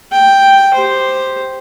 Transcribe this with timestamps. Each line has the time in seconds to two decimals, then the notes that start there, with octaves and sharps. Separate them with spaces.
0.12 G5
0.74 G4 C5